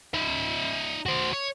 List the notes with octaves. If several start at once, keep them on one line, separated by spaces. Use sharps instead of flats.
D#4 E5
F#4 C5
C#5